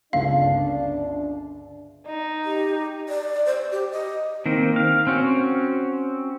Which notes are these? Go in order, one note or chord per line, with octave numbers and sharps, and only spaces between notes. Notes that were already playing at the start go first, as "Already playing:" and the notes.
G1 C#2 D4 F5
D#4
G4
D5
C5
G4
D#5
D#3 A#3 C4
F5
C4 C#4 F#4